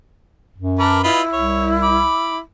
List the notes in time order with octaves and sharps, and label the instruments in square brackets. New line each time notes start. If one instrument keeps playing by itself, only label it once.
[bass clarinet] F#2
[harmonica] A#4 B4 D6 [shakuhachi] A5
[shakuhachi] E4 [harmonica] F4 B4 D#5
[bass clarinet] C2 [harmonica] C#5
[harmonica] B5 D6